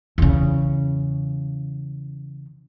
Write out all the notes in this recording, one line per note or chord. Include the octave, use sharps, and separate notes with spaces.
E2 C#3